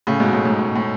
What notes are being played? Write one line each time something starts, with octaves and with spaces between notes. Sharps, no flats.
A2 C#3
G#2 B2
A2
G#2
A2
A2